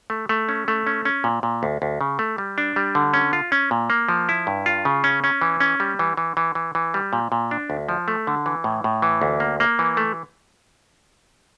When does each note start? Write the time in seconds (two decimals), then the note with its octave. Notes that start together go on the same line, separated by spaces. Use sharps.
0.10 A3
0.29 A3
0.49 C#4
0.68 A3
0.87 C#4
1.05 C#4
1.24 A#2
1.43 A#2
1.63 D2
1.82 D2
2.01 C#3
2.19 A3
2.38 G3
2.58 D4
2.76 G3
2.95 D3
3.14 C#4
3.33 F4
3.52 C#4
3.71 A#2
3.90 A#3
4.09 F3
4.29 E4
4.47 G2
4.66 F4
4.85 C#3
5.04 C#4
5.24 C#4
5.41 E3
5.60 C#4
5.80 G3
5.99 E3
6.17 E3
6.37 E3
6.55 E3
6.75 E3
6.94 G3
7.13 A#2
7.32 A#2
7.51 D4
7.70 D2
7.89 F3
8.08 A3
8.27 D3
8.46 E3
8.64 A2
8.84 A2
9.02 E3
9.22 D2
9.40 A#3
9.60 A#3
9.79 E3
9.97 A3